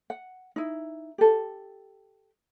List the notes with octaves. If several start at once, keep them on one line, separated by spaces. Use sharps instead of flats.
F#5
D#4 E4
G4 A4